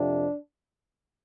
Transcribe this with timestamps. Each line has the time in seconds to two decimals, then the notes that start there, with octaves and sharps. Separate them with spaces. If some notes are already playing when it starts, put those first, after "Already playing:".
Already playing: F2 C3 D4